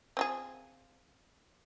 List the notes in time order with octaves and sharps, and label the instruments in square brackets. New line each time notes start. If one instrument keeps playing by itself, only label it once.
[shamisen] C4 F4 G#4